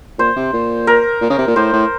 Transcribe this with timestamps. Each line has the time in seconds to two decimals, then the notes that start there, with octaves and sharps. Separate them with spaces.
0.19 A#2 C5
0.36 C3
0.53 A#2
0.87 A#4
1.21 A#2
1.30 C#3
1.38 C3
1.47 A#2
1.56 A2 C5
1.73 A2